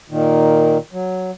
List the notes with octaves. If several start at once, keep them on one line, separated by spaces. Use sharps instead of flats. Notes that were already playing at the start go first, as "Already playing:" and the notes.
A#2 D#3
F#3